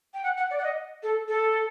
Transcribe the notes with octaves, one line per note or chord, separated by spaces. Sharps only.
G5
F#5
F#5
D5
F#5
D#5
A4
A4